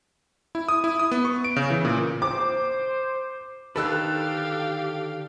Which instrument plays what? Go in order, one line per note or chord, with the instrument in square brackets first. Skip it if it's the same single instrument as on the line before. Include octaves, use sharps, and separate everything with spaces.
[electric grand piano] E4
D#6
E4
D#6
B3
C#6
D7
C#3
E3
A#2
[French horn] C5 [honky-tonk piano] D6
[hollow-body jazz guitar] D3 D#3 B4 [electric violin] G4 F5 [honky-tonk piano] A4 E6 F#6